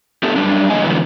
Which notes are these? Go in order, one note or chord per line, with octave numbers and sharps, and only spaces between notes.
A3 B3 D4 G4 A4
F#2 G3 D4
E2 C#3 A#3 D#5 G#5
G#2 D3 E3 F#3 B3